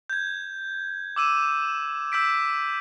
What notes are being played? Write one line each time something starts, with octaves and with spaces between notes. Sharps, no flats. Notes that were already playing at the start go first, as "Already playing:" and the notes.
G6 G#6
D6 E6 D#7 E7
E6 G6 B6 D7